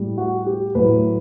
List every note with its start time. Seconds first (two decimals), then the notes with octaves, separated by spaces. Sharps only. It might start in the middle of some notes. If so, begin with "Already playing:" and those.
Already playing: A2 G3
0.18 F#4
0.46 G4
0.75 A2 F#3 B4